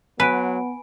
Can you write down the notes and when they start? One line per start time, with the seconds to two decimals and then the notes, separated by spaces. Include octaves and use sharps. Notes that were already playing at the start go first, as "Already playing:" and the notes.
0.20 F#3 B3 B4 G#5 B5 D7